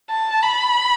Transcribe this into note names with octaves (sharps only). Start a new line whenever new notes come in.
A5
B5